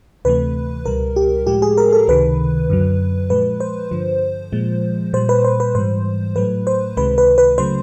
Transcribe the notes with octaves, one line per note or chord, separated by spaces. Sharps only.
D2 C3 E3 A3 B4
C#2 B2 G3 A#4
G4
A2 F3 G#3 G4
G#4
A#4
A4
C#2 C3 D#3 B4
F#2 D3 F#3
A#2 F3 G#3 B4
C5
G2 D3 F3
A#2 F3 G#3
A#2 G3 C5
B4
C5
B4
G#2 E3 G3 C5
A2 F#3 A3 B4
C5
C#2 C3 D#3 G#3 B4
B4
B4
C#3 F#3 A3 C5